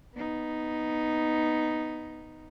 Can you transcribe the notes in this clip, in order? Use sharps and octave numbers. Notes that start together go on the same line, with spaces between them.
B3 D#4